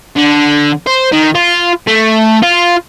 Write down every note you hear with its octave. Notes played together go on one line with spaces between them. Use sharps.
D3
C5
D#3
F4
A3
F4